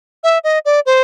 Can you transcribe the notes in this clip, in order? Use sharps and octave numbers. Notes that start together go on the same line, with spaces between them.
E5
D#5
D5
C5